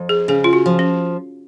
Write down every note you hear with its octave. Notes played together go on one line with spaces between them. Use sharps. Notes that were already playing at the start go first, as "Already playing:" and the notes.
Already playing: F2
G#4
C#3 G#4
F4
F#4
F3
C#4